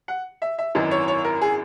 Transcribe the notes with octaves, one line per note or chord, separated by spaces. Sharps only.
F#5
E5
E5
G#1 F#2 E3 D#5
C#5
C#5
A#4
G#4